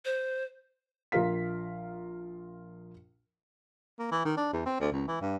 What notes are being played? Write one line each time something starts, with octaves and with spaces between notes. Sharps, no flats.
C5
A#1 F4 A#4 F5 B6
A#3
E3
D#3
D4
E2
C4
D2
C#2
E3
G2